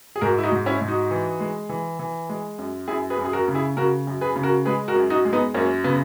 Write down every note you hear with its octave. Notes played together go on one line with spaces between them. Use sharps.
G#4
G#2 F#4 A#4
E4
D#4 F#4
G#2
C#4 E4
G#2
D#4 F#4
E3
G#3
E3
E3
G#3
F#2
F#2 E4 G#4
G#4 B4
F#2
G#4
F#4 A#4
C#3
E4 G#4
C#3 F#4 A#4
F#2
G#4 B4
C#3
F#4 A#4
G#3 G#4 B4
F#4 A#4
F#2
D#4 F#4
G#3
B3 D#4
F#2 A#3 C#4
C#3 B3